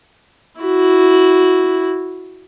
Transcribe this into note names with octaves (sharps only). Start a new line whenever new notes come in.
E4 F#4